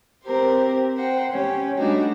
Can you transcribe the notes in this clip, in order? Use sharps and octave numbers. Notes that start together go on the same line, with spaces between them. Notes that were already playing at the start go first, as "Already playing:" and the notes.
C4 G4 A#4 C5
C5 F#5 G5
C#4 G4
G3 A3 D4 D#4 F#4